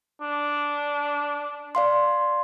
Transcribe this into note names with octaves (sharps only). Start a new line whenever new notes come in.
D4
D5 F5 C6